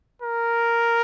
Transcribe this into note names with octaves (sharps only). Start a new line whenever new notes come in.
A#4